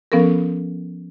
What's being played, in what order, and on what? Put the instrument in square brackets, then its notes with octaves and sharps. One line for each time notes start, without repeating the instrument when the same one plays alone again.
[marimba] F3 B3 C#4 A4 A#4